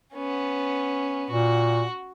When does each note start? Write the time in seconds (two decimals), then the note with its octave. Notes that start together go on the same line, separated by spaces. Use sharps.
0.13 B3 C#4
1.30 A#2 F#4